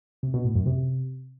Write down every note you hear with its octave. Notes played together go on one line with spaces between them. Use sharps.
C3
B2
A2
F#2
C3